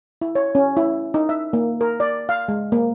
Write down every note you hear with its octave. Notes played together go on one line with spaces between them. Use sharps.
E4
C#5
C#4
E4
D#4
E5
A#3
A#4
D5
F5
G#3
A#3